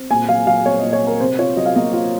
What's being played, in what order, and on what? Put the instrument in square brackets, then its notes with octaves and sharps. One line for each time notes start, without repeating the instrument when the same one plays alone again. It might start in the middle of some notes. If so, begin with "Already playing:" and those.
Already playing: [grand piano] C4
[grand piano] A#2 [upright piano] G#5
[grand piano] F#3 [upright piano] F5
[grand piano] F#3 [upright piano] F5
[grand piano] C4 [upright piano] C#5
[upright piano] D#5
[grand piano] A#2
[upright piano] C#5
[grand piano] C4
[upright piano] A#4
[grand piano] C3 [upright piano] C5
[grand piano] F4 [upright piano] C#5
[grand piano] F#3 [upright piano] D#5
[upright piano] F5
[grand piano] A#3 [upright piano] D#5
[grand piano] F4